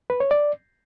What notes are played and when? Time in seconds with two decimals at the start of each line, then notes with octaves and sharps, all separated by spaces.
0.10 B4
0.20 C#5
0.31 D5